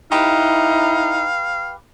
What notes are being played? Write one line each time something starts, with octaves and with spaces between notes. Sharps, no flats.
D#4 E4 G4 B4 F5